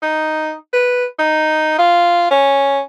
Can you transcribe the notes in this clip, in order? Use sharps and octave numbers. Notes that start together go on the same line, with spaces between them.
D#4
B4
D#4
F4
C#4